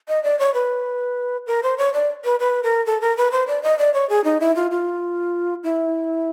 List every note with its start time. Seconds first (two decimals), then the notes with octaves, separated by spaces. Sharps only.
0.08 D#5
0.24 D5
0.39 C#5
0.54 B4
1.47 A#4
1.63 C5
1.78 C#5
1.94 D5
2.25 B4
2.40 B4
2.63 A#4
2.86 A4
3.02 A#4
3.17 B4
3.32 C5
3.47 D5
3.63 D#5
3.79 D5
3.94 C#5
4.09 G#4
4.24 D#4
4.41 E4
4.56 F4
4.71 F4
5.64 E4